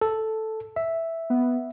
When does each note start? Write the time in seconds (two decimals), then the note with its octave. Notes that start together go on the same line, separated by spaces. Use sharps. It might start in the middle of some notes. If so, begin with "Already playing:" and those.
0.01 A4
0.76 E5
1.30 B3